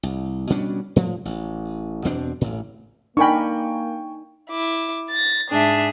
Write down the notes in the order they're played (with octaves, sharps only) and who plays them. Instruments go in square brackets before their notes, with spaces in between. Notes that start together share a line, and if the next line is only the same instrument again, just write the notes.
[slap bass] C2
B2 G3 C#4 D4
A2 F3
A1
E2 B2 C4 D4
A1 A2
[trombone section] A#3 [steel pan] D4 A#4 B5 [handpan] D#4 [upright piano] G5 G#5 C#6
[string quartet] E4 D6
A6 A#6
G#2 D4 G#4 E5